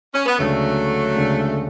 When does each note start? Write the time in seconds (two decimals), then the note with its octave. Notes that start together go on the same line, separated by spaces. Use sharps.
0.14 C#4
0.26 B3
0.39 D2 C#3 F#3 G#3 A3 D4
1.15 D2 C#3 G#3 D4